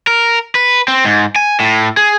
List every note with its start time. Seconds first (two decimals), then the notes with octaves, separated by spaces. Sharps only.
0.07 A#4
0.55 B4
0.88 C4
1.05 G#2
1.36 G#5
1.60 A2
1.97 G#4